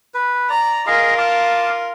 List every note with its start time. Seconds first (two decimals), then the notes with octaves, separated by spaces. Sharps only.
0.14 B4
0.50 D5 A#5
0.87 F4 G#4 A#4 D#5 F5
1.18 F5 A5 D6